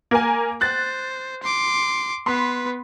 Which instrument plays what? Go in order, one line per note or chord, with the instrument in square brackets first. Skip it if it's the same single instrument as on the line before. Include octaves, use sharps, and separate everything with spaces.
[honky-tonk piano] A#3 A#4 G#5
[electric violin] C5 [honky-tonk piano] F#6 A6
[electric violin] C6 D6
[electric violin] B3 B4 [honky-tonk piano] C6